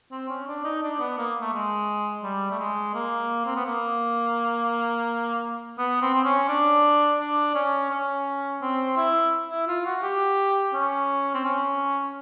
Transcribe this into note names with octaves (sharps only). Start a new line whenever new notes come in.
C4
C#4
D4
D#4
D4
B3
A#3
A3
G#3
G3
A3
G#3
A#3
C4
B3
A#3
B3
C4
C4
C#4
D4
D4
C#4
C#4
C4
E4
E4
F4
F#4
G4
C#4
C4
C#4